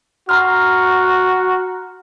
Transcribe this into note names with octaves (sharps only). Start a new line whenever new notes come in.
F#4 A#5 C6 F6